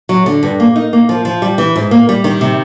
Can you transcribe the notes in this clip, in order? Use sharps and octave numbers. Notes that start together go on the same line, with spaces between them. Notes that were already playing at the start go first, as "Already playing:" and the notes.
F#3
D3
G2
A#3
D#4
A#3
F3
F3
G3
E3
G#2
A#3
G3
D#3
C3